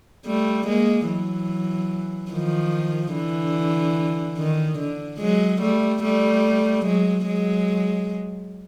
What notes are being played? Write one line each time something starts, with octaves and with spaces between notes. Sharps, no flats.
G3 A3
G#3 A#3
E3 F#3
D#3 F3
D3 E3
D#3
D3
F#3 G#3
G3 A3
G3 A3
F#3 G#3
F#3 G#3